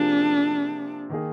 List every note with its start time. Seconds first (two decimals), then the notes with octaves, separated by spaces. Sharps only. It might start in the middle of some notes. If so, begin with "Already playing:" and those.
Already playing: C3 F3 A#3 D4 F4 G#4
1.10 D#3 A#3 D#4 G#4